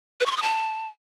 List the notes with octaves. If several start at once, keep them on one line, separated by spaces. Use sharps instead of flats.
B4
C#6
C6
D#6
A5